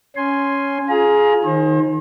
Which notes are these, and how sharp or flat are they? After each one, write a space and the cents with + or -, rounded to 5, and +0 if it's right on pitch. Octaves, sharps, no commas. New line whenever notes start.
C#4 +5 G#5 +0 C6 +0
F4 +5 G#4 +15 A#5 +30
D#3 +0 C5 +45